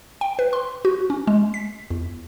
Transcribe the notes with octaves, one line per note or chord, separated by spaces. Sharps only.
G5
B4
C6
F#4
C#4
G#3
B6
E2